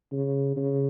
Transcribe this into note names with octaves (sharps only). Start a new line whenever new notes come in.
C#3
C#3